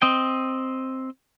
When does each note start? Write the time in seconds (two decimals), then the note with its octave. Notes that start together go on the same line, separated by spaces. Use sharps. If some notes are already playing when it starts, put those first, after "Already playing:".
0.02 C4 D#5 G5